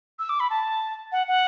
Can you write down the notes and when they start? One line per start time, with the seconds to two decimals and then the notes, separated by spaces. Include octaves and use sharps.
0.19 E6
0.29 D6
0.40 B5
0.50 A5
1.12 F#5
1.28 F#5